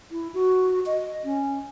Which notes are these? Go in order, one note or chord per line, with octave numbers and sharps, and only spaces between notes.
E4
F#4
D#5
C#4